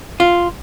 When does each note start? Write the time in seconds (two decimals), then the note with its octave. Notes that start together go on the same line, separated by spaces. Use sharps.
0.20 F4